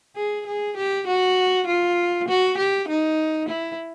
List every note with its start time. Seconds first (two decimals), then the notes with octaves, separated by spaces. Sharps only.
0.17 G#4
0.47 G#4
0.77 G4
1.07 F#4
1.67 F4
2.28 F#4
2.58 G4
2.89 D#4
3.49 E4